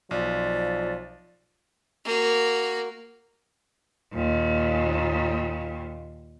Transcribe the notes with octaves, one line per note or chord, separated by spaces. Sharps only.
B1 F3 D5
A#3 F#4
D#2 A#2